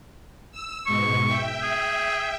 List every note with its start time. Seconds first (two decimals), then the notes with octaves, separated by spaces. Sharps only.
0.52 E6
0.87 G#2 B2 G#3 C#6
1.27 E5 G5
1.63 G#4